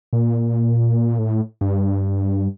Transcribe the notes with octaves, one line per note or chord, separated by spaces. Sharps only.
A#2
A2
G2